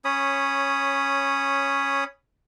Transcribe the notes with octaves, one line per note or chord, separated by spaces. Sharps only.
C#4 C#5 B5 D#6